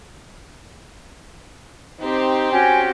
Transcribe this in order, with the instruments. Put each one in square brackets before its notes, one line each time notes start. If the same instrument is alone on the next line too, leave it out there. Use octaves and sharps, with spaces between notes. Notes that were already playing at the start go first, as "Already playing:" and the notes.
[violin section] C4 G4 [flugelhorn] D#4
[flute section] C#4 F#4 G5 [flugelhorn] G#5